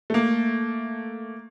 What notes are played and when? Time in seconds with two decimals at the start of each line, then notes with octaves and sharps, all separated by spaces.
0.10 A3 A#3